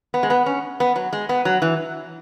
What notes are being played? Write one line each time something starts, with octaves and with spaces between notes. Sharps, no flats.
B3
G#3
B3
C#4
B3
F#3
G#3
B3
F#3
E3